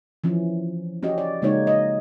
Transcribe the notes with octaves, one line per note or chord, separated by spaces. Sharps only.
E3 F3 C#4
C#4 F#4 G4 D#5
D5
C#3 G#3 A#3 D#4 F#4 C#5
D#5